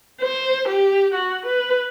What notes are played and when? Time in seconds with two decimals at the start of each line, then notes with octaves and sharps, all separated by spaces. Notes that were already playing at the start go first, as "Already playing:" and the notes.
0.21 C5
0.68 G4
1.14 F#4
1.46 B4